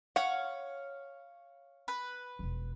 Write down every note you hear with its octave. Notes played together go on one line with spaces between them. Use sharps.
C#5 F5 F#5 C#6
B4
E1 F3